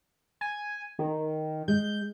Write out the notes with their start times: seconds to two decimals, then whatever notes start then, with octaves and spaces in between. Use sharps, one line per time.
0.41 G#5
0.99 D#3
1.68 G#3 G6